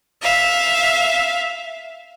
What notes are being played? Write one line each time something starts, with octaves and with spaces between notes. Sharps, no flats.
E5 F5